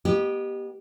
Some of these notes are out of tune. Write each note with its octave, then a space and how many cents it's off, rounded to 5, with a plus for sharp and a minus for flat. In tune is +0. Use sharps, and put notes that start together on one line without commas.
B3 -35 G4 +0 D#5 -25